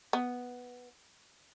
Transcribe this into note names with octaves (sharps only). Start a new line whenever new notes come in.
B3